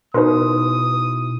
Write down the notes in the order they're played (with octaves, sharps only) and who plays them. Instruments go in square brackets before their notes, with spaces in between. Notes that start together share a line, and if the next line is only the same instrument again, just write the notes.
[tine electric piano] B2 E4 [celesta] D#4 C6 [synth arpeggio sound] A#4 B4 [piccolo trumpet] D#6